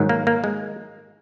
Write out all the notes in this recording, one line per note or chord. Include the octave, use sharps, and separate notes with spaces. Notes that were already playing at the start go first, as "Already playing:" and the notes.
Already playing: G#2 D#3 F#3
A#3
A#3
G#3